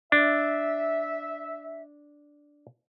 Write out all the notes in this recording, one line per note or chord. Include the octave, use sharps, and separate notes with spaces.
D4 E5